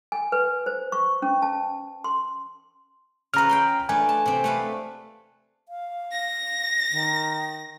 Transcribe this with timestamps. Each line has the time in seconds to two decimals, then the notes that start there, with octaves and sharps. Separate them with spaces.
0.12 G#5
0.32 B4
0.66 C5
0.92 C#6
1.22 C#4
1.42 A5
2.04 C6
3.34 C#3 F4 B4 A#5 F6
3.49 G5 B5 C6
3.89 A3 D4 B4 G#5
4.09 A5
4.26 C3 C4
4.44 A3 B4 F5
5.69 F5
6.12 A#6
6.91 D#3